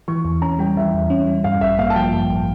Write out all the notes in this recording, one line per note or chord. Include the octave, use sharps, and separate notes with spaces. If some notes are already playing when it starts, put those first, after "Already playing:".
E3 C#6
E2
C#4 A#5
G3 G5
E3 E5
E2
C#4
G3
G2 F5
A1 E5
A#3 F5
A5
F3 G5
G2
A1